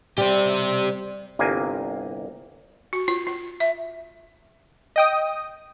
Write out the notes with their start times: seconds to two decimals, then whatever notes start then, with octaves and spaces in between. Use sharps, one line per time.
0.18 G3 G4 C5
1.39 G1 C2 A#3 G#5
2.93 F#4
3.08 F4
3.27 F4
3.60 E5
4.96 D#5 G5 D#6